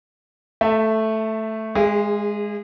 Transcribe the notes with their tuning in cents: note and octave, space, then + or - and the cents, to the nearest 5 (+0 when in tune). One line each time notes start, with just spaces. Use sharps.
A3 +0 E5 +0 A5 +25
G#3 +0 G#4 -30 E5 +45